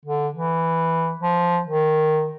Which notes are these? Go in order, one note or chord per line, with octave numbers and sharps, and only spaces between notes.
D3
E3
F3
D#3